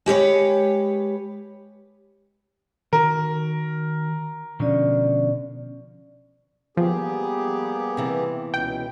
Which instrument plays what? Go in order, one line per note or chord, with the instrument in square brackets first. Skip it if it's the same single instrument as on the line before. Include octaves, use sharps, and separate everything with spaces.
[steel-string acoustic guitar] G#3 G4 B4 C#5
[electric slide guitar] D#3 F#4 [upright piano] A#4
[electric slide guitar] B2 D3 F3 [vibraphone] C#4 D5
[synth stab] F3 [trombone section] G3 A#3 B3 [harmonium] G4 G#4
[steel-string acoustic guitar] C3 E3
[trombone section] C#2 B2 [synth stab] G5